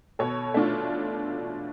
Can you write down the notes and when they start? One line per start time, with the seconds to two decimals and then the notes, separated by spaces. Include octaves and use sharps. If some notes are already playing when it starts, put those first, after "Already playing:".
0.19 B2 A4 C#5
0.54 A3 D4 F4